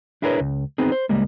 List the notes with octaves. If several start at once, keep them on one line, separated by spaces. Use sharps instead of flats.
D4 E4 G#4 A#4 B4 C#5
C#2
B3 C4 D#4 G#4
C5
C#2 G3 G#3 A#3